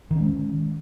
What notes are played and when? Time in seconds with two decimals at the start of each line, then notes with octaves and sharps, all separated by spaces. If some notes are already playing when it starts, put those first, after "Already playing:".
0.11 D#3
0.15 C#4
0.20 G#3